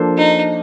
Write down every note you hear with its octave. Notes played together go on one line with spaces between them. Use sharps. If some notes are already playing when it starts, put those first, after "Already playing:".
Already playing: F3 A#3 D4 A4 C5
D#4